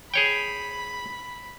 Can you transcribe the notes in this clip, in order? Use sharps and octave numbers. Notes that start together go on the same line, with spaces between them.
G#4 C#5 G5 B5